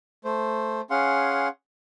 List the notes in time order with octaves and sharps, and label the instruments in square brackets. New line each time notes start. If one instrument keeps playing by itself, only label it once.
[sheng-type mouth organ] A3 C5
C#4 G#4 F5 F#5 C6